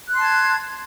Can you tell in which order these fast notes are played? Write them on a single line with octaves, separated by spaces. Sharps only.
F#6 C6 A5 G#6